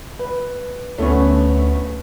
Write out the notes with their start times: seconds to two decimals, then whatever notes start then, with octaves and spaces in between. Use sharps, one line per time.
0.19 B4
0.98 D2 A3 B3 C#4